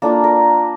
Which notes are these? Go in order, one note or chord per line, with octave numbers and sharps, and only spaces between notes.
A#3 D4 F4 A4
A#4